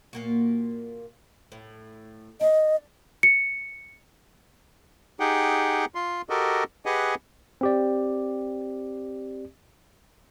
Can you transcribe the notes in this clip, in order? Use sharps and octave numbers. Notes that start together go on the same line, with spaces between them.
A#2 A#3 F#4
A2
D4 D#5
C#7
D#4 G4 G#4 F#5 G5
F4 C6
F#4 G4 A4 A#4 D#5
G4 G#4 B4 D#5 F#5 G#5
C4 G4 D5